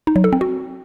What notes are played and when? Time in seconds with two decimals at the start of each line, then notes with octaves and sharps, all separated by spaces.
0.07 D#4
0.16 F#3
0.24 A4
0.33 C4
0.41 F#4